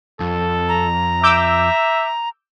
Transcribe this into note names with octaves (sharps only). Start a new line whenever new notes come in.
F2 A4
A#5
E5 D6 E6 G6